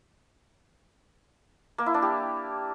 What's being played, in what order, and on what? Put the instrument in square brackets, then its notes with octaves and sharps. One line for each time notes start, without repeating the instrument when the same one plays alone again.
[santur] A#3
E4
D4
G4